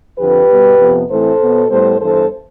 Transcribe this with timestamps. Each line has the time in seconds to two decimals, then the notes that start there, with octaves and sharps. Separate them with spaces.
0.18 F2 D3 F3 G4 B4
0.49 B2 G3 B3
0.80 F2 C3 F3 B3
1.10 A2 E3 A3 C4 A4 C5
1.40 B2 B3
1.70 A2 G3 B3 A4 C5
2.00 G2 E3 B3 A4 C5